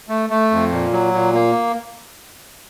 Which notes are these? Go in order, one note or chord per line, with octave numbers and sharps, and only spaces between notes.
A3
A3
F2
A#2
F#3
A#2
A#3